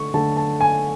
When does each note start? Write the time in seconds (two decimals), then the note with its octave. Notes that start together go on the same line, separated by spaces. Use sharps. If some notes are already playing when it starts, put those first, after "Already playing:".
Already playing: D3 A3 C#6
0.14 D3 A3 A5
0.37 A5
0.61 G#5